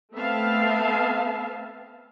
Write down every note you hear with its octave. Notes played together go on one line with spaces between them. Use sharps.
A3 B3 C4 E5 F5 A5